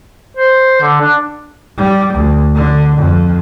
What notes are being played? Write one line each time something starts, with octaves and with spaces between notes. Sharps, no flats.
C5
D3
D4
G3
D2
D3
F2